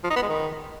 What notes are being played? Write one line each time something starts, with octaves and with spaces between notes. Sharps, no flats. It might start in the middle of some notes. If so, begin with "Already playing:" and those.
F3
D#4
B3
G#3
D#3